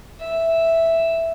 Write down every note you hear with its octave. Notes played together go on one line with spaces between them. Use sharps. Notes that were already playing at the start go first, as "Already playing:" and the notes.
E5